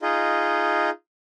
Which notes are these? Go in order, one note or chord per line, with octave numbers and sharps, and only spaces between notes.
D#4 F4 G#4 D#5